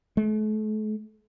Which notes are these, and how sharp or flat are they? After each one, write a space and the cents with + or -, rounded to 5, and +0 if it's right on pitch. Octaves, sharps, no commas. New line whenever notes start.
A3 -40